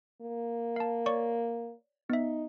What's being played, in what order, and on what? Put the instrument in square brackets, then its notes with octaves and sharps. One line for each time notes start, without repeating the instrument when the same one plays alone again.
[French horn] A#3
[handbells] F5 A5
C#5 D5 C#6
[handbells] B3 E5 [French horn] D#4